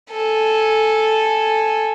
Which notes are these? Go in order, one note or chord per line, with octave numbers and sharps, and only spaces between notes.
A4 G#5